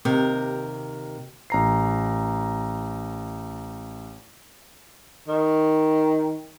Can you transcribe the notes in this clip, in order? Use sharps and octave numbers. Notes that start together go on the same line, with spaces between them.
D#2 C3 A#4
A1 A#5 C7
D#3